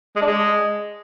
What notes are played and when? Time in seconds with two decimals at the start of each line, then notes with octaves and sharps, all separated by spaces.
0.16 G#3
0.22 D4
0.27 G#3